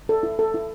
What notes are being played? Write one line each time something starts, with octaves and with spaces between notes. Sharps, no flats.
A4
E4
A4
E4